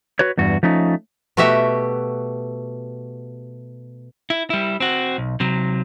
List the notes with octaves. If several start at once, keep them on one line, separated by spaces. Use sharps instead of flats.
F#4 B4 C#5
E2 G2 F#4
F3 A3 C#4 D#4
B2 A3 F#4 G4 E5
E4
G3 E4
C4 F#4
B1
C3 F#3